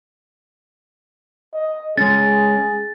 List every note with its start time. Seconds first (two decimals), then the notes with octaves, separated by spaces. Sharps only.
1.54 D#5
1.98 G#3 C#4 G#4 A6